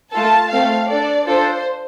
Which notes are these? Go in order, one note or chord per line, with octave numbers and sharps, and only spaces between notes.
A3 F4 A4 A5
A3 C4 A4 F5
D4 A4 D5
D4 F4 A4 C5